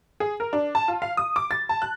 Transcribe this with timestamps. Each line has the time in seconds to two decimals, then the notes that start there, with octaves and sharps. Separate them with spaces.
0.20 G#4
0.40 A#4
0.53 D4
0.75 A5
0.88 F4
1.02 F5
1.17 D#6
1.36 D6
1.51 A6
1.69 A5
1.82 F#6